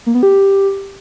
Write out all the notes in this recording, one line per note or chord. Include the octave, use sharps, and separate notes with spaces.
A#3
B3
G4